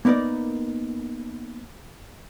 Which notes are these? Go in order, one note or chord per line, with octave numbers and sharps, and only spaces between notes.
A#3 B3 D#4 A#4 D5